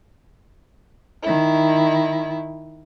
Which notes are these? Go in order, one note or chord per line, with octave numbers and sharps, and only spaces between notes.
D#3 E4